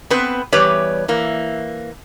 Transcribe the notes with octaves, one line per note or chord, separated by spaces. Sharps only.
B3 C4 B4
E2 G3 G4 B4 C#5
E3 A#3